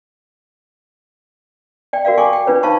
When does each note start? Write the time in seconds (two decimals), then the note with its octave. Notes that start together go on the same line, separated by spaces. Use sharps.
1.93 D5 G5
2.05 F#4 A#4 D5 F5
2.18 A4 G5 G#5 C#6 D6
2.33 G5
2.47 D4 F4 B4 C#5
2.63 D#4 C5 F5 A5 B5 C#6